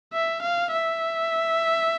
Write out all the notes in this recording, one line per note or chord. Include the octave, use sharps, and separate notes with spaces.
E5
F5
E5